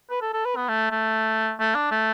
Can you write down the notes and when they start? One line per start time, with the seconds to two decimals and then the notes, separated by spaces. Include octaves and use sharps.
0.10 B4
0.22 A4
0.34 A4
0.45 B4
0.56 B3
0.68 A3
0.91 A3
1.60 A3
1.75 D4
1.91 A3